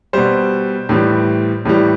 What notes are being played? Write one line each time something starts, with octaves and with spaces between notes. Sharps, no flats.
B2 G3 C5
A2 E3 G3
A2 E3 G3